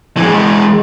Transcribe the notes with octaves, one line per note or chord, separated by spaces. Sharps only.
E3 G#3